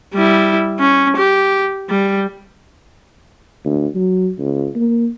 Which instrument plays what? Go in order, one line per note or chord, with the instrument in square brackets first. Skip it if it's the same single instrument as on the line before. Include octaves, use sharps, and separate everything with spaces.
[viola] G3 E4
C#4
G4
G3
[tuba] D2
F#3
C#2
A#3